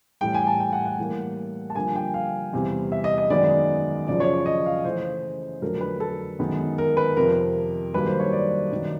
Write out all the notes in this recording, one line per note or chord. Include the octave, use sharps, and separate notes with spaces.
A2 E3 G3 G5
G#5
A5
G5
F#5
F#5
A2 E3 G3 A#3
A5
G2 D3 F3 A#3 G#5
G5
F5
E2 C3 E3 G3
E5
D#5
D#5
F#2 D#3 G#3 B3 D5
F#2 C#3 F3 D5
C#5
D5
D#5
F5
C#3 E3 A3 C5
F2 D3 F#3 A3 A#4
B4
A4
F#2 D#3 G#3 B3
A#4
B4
F2 C3 F3 A#4
G2 D#3 F#3 A#3 B4
C5
C#5
D5
F#2 D#3 F#3 A#3